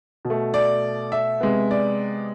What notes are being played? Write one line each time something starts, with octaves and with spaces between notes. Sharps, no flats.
B2
A3
D5
E5
C3 G#3 B3
D5